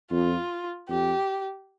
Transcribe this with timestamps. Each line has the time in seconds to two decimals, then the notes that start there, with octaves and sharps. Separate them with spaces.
0.12 F2 F4
0.89 F2 G4